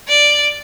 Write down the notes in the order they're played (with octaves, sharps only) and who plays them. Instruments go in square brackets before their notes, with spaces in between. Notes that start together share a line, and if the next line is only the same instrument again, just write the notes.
[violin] D5